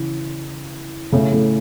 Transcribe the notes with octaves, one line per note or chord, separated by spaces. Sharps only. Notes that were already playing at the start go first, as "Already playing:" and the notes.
Already playing: C#3 E3
A2 C#3
A2